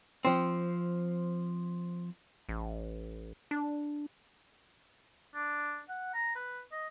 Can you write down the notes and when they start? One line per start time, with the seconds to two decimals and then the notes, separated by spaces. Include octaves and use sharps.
0.25 F3 C4
2.49 A1
3.51 D4
5.35 D4
5.89 F#5
6.14 A#5
6.35 B4
6.72 D#5